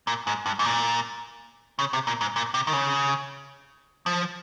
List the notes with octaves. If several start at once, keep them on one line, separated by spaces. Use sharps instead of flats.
A#2
G#2
G2
G#2
A#2
C#3
C3
A#2
G#2
A#2
C3
D#3
C#3
F3